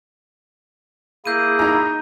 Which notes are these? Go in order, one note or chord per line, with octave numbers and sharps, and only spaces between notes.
A#3 E4 G#4 G6 D#7
D#4 A#5